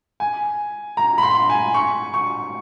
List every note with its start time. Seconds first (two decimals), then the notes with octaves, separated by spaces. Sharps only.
0.20 G#5
0.97 A#5
1.18 B5
1.23 C6
1.50 G#5
1.74 C#6
2.14 C#6